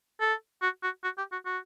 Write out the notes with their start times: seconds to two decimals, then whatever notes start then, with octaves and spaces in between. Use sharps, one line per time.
0.21 A4
0.62 F#4
0.83 F#4
1.04 F#4
1.18 G4
1.32 F#4
1.46 F#4